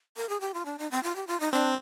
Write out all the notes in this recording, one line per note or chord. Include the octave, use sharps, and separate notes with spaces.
A#4
G#4
G4
F4
D4
D#4
C4
F4
G4
F4
D#4
C4 D4